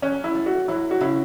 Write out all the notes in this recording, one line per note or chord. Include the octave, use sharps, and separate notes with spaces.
F#3 C#4
E4
A3
F#4
F#3 E4
F#4
C#3 E4